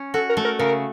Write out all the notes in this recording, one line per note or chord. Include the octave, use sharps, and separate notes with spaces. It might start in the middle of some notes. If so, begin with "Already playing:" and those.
Already playing: C#4
F#4 A4
A#4
A3
A#4
C#3 A#4